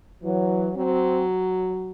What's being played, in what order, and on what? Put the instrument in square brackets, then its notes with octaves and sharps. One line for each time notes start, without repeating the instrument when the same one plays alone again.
[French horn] E3 [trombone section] F#3
[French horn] F#3 [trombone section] C4